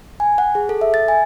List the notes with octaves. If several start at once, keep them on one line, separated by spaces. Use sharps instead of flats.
G#5
F#5
G#4
A4
E5
A6
G#5